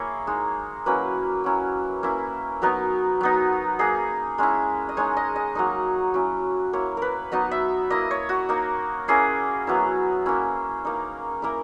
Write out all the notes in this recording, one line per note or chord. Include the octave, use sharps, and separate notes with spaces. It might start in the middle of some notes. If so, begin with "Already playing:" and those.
Already playing: A#3 E4 G#4 C#5
G#3 D#4
F#3 A#3 C#4 E4 B4
F#3 C#4 E4
A#3 C#4 E4
F#3 B3 D#4 A#4
F#3 B3 D#4
A#3 D#4 G#4
G#3 C#4 E4
D#5
G#3 D#4 C#5
D#5
D#5
F#3 A#3 D#4
F#3 C#4 E4
A#3 E4 C#5
A#4 B4
F#3 B3 D#4 D#5
E5
A#3 E4 D#5
C#5
F#4
A#3 D#4
A#3 C#4 E4 G#4
F#3 B3 E4
A#3 C#4 E4
A#3 D#4
A#3 E4 A#4